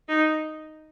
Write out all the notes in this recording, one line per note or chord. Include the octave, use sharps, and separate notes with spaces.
D#4